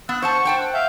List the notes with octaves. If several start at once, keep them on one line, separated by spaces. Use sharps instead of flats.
B3 E6 F#6
C5 F#5 A5 C#6
C5 G5 A5
F#5
E5 F5 G6